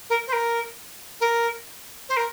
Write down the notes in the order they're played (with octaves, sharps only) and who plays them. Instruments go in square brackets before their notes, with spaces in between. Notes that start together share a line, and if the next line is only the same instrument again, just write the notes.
[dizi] A#4
C5
A#4
A#4
C5
A#4